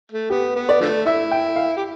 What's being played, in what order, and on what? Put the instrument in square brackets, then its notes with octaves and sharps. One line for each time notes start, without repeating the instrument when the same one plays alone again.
[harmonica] A3
[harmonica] B3 [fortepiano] G4
[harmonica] B3
[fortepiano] D5
[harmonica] D3 F3 A3
[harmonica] E4 [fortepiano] E5
[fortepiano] G5
F5
[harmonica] G4